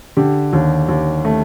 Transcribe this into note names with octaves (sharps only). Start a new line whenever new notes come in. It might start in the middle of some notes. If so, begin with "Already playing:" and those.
D3 G4
D#2
D#2
A3